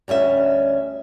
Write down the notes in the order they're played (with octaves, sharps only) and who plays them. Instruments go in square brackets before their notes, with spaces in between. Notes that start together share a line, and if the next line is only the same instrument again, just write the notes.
[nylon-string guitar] D2 G3 C#4 E5